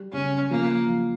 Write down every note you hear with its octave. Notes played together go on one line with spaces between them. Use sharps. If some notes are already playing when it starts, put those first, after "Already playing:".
Already playing: G3
C#3 C#4
F3 A#3
F3